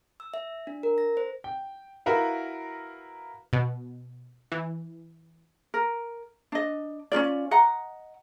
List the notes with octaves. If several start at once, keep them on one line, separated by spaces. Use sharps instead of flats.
E6
E5
D4
A#4
A#6
C5
G5
E4 F#4 A#4 B4 F5
B2
E3
A#4
D4 D#5
C#4 D4 F4 D5
D#5 F#5 A#5